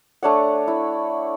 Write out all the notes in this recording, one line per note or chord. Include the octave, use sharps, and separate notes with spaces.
A3 D4 C#5 F#5
E4